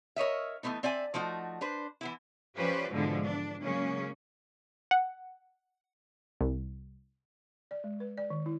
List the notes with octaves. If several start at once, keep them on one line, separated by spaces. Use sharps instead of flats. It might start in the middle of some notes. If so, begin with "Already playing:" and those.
A#4 C#5 D#5 E5
E3 F3 A3 B3 D#4
C4 D5 E5 G#5
F3 A3 D#4 F#4
D4 B4 C5
E3 B3 E4
F3 C#4 G4 B4 C5 D5
G#2 B2 D3 E3 F3 G#3
D4
C#3 F#3 G#3 A#3 C#4
F#5
C2
D5
G#3
B4
D5
D#3
E4